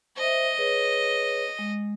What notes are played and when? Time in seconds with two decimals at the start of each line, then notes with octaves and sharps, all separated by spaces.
0.17 C5 D#5 E5
0.58 G#4 B4 C#5
1.59 G#3